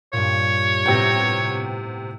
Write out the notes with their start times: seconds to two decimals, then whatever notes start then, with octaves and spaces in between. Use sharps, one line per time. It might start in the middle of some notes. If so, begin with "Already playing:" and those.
0.13 G2 A#2 C#5
0.86 A2 C3 B3 G5 A#6